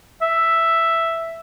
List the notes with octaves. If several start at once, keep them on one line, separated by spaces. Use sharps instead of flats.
E5